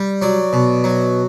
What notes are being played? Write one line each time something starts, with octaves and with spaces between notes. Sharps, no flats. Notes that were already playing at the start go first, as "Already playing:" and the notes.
Already playing: G3
F#3 D5
B2
F#3